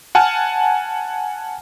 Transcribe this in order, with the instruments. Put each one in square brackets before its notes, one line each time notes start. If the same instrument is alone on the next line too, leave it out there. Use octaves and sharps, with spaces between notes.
[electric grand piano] F#5 G#5 A5 F6